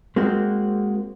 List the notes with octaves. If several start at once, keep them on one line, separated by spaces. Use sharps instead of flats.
G#3 A#3 C4 F#4